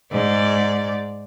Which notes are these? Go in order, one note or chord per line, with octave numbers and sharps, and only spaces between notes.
G#2 D5